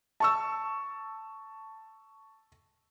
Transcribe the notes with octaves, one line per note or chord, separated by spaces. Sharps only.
A5 C#6 E6